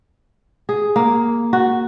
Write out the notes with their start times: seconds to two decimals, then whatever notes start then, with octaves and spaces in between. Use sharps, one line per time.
0.69 G#4
0.96 A#3
1.53 F#4